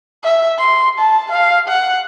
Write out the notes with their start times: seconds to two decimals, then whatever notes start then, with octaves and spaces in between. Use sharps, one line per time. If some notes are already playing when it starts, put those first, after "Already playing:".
0.24 E5
0.59 C6
0.99 A5
1.32 F5
1.68 F#5